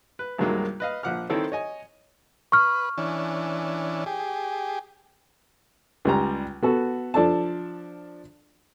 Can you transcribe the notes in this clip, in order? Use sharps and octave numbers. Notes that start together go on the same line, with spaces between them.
B4
C2 G2 D#3 F#3 G#3 A#3
B4 D#5 F5
A#1 F3 F#5 D6 F6
D#3 C4 E4 A4 C5 C#5
C#5 D#5 G#5
B4 C#6 F6
E3 C#4 D4
G4 G#4
C#2 G3 A#5
B3 F#4 A4
F3 D4 A4 A5